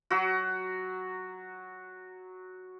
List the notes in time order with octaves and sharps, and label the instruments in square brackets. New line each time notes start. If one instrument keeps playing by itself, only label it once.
[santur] F#3 F#4